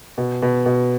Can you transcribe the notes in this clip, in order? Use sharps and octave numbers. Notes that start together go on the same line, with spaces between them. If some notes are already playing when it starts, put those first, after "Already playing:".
B2
B2
B2